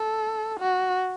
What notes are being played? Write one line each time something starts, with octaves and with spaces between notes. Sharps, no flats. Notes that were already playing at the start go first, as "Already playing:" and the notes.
Already playing: A4
F#4